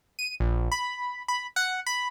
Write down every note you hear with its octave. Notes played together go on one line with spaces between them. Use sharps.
D#7
A#1
B5
B5
F#5
B5